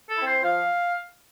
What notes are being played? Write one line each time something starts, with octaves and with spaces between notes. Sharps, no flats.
A4
C4 E4
C5
F3 F5